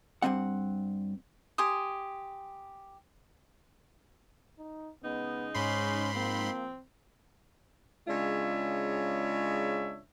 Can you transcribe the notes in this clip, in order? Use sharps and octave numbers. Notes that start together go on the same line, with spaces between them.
G2 D#3 C4 F#5
G4 G#5 C6 D#6
D#4
C#3 G#3 B3 D#4
G#2 C#4 B5 C6
F3 A#3 C4
C#3 G#3 D4 F4 C#5 E5